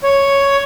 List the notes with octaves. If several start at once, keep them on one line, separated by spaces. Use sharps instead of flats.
C#5